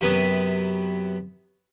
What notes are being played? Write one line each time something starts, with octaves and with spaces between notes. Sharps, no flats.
F#2 C3 B3 B4 D#6